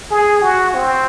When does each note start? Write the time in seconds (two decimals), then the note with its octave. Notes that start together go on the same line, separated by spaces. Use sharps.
0.11 G#4
0.42 F#4
0.75 C4